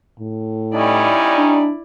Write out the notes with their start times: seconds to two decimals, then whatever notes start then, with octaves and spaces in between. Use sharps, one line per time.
0.20 A2
0.74 G3 C#4 D#4 E4 D5
1.36 D4